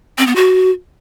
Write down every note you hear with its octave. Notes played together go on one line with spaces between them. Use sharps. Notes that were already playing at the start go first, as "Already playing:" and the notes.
C4
B3
F#4